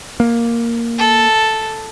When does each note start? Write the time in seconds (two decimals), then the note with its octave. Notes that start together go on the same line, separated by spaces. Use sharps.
0.20 A#3
0.98 A4